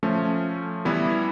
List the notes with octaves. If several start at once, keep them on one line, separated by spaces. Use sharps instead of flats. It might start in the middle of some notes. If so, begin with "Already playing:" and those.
F3 A3 C#4
E3 G3 B3 E4